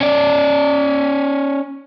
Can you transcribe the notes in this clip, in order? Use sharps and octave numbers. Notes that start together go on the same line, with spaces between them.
C#4 D5